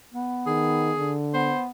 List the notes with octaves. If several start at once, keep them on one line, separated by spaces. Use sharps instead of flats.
B3
D#3 G#4
D3
B3 C5